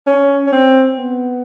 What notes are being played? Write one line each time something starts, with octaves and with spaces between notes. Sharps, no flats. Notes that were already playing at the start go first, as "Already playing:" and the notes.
C#4
C#4
C4
B3